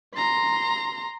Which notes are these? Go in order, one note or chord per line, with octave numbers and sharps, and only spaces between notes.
A#5 C6